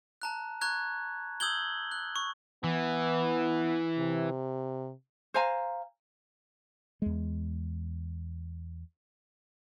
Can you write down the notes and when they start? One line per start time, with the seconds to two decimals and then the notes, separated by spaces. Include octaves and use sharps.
0.22 A5 A#5 F#6
0.61 A#5 C#6 F#6 G#6
1.40 D#6 E6 G6 G#6 F#7 G7
1.92 F#6
2.16 C#6
2.64 E3 B3
3.98 C3
5.34 C5 F5 G#5 A#5
7.02 E2 G#3